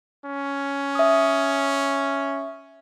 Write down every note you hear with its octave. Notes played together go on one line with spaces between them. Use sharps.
C#4
E5 D#6